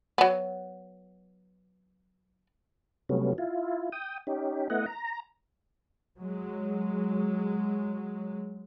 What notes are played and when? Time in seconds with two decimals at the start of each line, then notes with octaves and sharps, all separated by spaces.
0.18 F#3 B3
3.09 C3 F#3 G3 A3 B3 C#4
3.38 E4 F4
3.92 G5 D#6
4.27 C#4 D#4 G4
4.70 A3 B3 E4 D#5 F#5
4.86 A#5
6.18 F#3 G#3